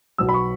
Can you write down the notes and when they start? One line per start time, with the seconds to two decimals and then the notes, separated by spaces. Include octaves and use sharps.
0.18 B1 B2 F#3 E6
0.29 B5
0.34 C#6